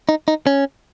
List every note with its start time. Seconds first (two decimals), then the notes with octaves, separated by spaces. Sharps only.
0.09 D#4
0.28 D#4
0.47 C#4